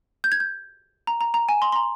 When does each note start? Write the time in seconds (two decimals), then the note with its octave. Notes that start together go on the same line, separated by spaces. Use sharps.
0.24 G6
0.32 G#6
0.40 G6
1.07 A#5
1.21 A#5
1.34 A#5
1.49 G#5
1.62 C6
1.72 C6
1.76 A#5